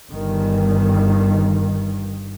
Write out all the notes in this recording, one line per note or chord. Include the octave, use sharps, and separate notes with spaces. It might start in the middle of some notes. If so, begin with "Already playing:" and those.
G1 G2 D#3